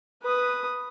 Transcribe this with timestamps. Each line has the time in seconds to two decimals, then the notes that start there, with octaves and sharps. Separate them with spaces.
0.22 B4 D#6